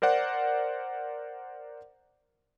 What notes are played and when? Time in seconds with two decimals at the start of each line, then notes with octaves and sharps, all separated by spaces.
0.02 A#4 C5 D5 F#5